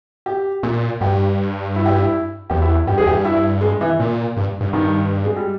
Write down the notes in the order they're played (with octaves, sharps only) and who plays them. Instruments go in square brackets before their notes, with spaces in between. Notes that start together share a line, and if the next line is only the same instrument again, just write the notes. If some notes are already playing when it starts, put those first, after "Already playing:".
[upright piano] G4
[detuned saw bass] A#2
[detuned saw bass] G2 [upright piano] G4
[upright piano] E4
G4
E4
[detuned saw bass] E2 [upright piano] G4
[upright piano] E4
[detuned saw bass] G2 [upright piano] G4
[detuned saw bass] E2 [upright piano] G#4
[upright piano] G4
[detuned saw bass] G2
[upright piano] E4
G#3
E3
[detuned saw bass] A#2
G2
G2
[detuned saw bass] G2 [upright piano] D#3
[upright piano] G#3
G3